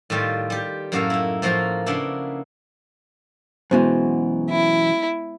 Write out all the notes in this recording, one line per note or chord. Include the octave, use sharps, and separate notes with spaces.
A2 D#3 G3 F4
G3 G4
F#2 A2 A#3 F#4 A4 F5
D#4 E4
A2 F3 A#3 F#4 A#5 C6
C#3 A#3 B3 D4 E4
F#2 B2 E3 G#3 B3 C5
E4